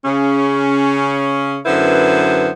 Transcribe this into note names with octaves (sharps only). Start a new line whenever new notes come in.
C#3 C#4
F#2 D3 B3 E4 B4 C5